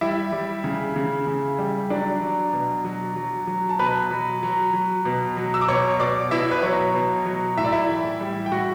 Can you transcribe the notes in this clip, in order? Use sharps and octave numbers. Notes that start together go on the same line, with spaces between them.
G3 E4 E5
G3
C#3
C#3
C#3
G3
F#3 D4 D5
F#3
B2
F#3
F#3
F#3
A5
B2 B4 B5
F#3
F#3
F#3
B2
F#3
E6
D6
B2 C#5 C#6
B2 D5 D6
B2 E4 E5
B4
F#3 C#5
B2
F#3
A2 E5
D5
E4 E5
E3
G3
G5
A2 F#4 F#5